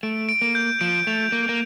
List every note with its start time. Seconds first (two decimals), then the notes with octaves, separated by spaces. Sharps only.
0.03 A3 D7
0.29 D7
0.42 A#3
0.55 G6
0.81 F3 D7
1.07 A3 F7
1.32 A#3 D7
1.49 A#3